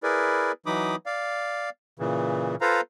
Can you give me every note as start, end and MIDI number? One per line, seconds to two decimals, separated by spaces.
0.03 0.52 64
0.03 0.52 68
0.03 0.52 70
0.03 0.52 71
0.03 0.52 74
0.66 0.96 52
0.66 0.96 54
0.66 0.96 63
0.66 0.96 83
0.66 0.96 86
0.66 0.96 87
1.06 1.70 74
1.06 1.70 77
1.99 2.55 46
1.99 2.55 49
1.99 2.55 52
2.61 2.81 65
2.61 2.81 69
2.61 2.81 71
2.61 2.81 72
2.61 2.81 77
2.61 2.81 82